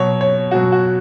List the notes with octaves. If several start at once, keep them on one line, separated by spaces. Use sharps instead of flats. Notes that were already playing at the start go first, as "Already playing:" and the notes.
Already playing: B2 F#3 C#5
C#5
B2 F#3 F#4
F#4